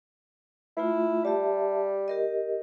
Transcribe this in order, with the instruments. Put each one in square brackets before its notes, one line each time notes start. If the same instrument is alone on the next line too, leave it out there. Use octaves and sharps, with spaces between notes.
[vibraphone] A3 F4 [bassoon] E4
[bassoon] G3 [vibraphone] G4 E5 A5
[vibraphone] G4 A#4 D#5